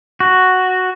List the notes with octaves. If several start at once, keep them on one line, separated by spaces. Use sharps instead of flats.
F#4